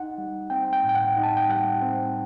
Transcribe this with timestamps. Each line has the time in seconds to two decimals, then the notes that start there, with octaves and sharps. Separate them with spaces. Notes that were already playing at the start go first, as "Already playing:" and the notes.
Already playing: D#4 F#5
0.18 G3
0.50 C4 G5
0.73 G5
0.84 A2
0.89 G5
0.95 F#5
1.17 D#4
1.23 A5
1.37 G5
1.49 G3 F#5
1.82 C4